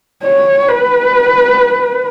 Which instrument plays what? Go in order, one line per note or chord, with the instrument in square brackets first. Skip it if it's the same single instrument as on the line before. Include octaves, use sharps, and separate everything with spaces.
[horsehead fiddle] C#5
B4